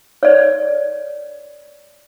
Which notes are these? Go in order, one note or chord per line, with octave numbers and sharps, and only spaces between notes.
C#5 D5